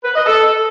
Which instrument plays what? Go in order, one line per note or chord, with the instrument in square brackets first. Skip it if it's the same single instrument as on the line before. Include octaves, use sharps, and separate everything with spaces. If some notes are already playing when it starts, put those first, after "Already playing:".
[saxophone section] B4
D#5
A4